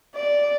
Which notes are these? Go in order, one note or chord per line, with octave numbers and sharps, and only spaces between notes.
D5